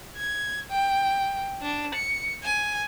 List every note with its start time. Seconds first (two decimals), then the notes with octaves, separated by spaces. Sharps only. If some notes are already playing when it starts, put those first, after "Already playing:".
0.17 G#6
0.70 G5
1.62 D4
1.95 C#7
2.43 G#5